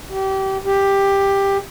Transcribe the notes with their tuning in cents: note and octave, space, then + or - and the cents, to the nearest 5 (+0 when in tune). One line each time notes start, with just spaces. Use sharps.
G4 -25
G4 +10